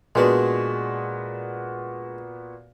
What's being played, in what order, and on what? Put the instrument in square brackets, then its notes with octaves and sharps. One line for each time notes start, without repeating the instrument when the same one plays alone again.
[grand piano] A#2 B3 F#4 [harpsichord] G#3 D4